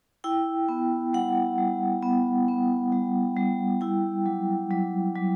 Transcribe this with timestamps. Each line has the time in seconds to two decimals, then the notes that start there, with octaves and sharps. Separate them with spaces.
0.24 E4 G5
0.69 B3
1.13 G3 F#5
1.58 G3
2.02 B3
2.48 B3
2.92 G3
3.37 G3
3.81 E4 G5
4.26 F#3
4.71 F#3
5.16 F#3